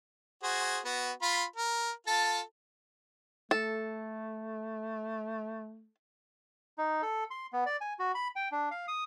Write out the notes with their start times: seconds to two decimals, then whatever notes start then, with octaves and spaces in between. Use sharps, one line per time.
0.43 F#4 G#4 C5
0.85 B3 F#4
1.22 F4 B5 C6
1.56 A#4
2.07 F4 A4 A5
3.51 A3 A4
6.78 D#4
7.02 A4
7.31 C6
7.53 B3
7.66 D5
7.81 G#5
7.99 F#4
8.15 B5
8.36 G5
8.52 D4
8.71 F5
8.88 D#6